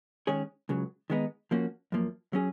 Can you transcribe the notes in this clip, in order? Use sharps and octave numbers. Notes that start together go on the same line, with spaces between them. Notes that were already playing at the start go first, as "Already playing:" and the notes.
D#3 G#3 C#4 G#4 C#5
C#2 C#3 F#3
D#3 G#3 B3 D#4
F3 A#3 C#4 F#4
F#2 F3 A#3
F#3 C#4 G#4